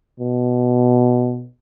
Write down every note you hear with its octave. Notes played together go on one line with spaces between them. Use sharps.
B2